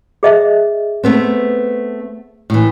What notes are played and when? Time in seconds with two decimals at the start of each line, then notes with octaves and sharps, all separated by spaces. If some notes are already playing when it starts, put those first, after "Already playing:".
0.23 G#4 D#5 E5
1.03 A3 B3 C4
2.50 A2 E3